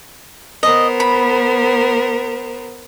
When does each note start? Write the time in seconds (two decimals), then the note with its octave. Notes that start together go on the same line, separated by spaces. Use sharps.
0.63 B3 A#4 C5 D#5
1.00 B5